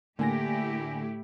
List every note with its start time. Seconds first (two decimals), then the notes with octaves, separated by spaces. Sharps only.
0.19 A2 D3 A3 A#3 E4 G4 G#5 A#6